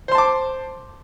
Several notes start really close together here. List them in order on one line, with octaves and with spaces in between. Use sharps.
C5 C6 A5 D6